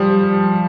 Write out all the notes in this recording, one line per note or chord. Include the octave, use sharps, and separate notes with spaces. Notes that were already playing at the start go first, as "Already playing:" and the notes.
Already playing: F3 G3